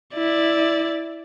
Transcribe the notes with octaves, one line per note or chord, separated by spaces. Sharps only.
E4 D5